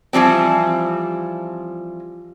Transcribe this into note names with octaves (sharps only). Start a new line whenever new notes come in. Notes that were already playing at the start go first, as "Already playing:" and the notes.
E3 F3 G3 C4